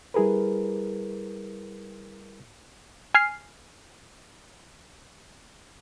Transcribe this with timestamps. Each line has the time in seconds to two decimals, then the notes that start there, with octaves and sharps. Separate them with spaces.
0.14 G3 E4 G#4 A#4 B4
3.14 G#5 F6 C7